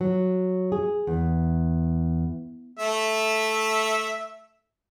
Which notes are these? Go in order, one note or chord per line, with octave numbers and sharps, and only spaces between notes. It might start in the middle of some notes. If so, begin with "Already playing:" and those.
F#3
G#4
E2
A3 E5